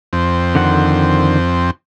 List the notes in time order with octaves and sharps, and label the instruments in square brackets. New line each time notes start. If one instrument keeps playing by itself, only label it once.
[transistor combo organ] F2 C4
[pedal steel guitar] D3 D#3 F#5